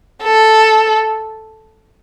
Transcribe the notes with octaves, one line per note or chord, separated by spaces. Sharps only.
A4